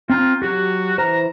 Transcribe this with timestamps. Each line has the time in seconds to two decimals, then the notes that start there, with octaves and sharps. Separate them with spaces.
0.10 C4 F4 A#5 G6
0.42 F#3 F#4 G4
0.98 E3 C5 A#5